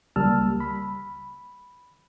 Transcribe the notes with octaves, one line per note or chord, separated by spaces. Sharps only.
C#2 G3 A#3 A5 E6 F6
B5